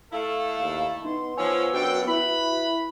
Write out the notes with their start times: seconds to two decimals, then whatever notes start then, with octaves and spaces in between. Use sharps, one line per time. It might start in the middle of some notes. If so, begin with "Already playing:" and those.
0.12 A3 E4 A4 F5
0.59 D#2
1.05 B3 D#4 C6
1.37 F3 C#5 G#5 E6
1.74 F#2 D4 F#4 G5
2.08 E4 B4 B5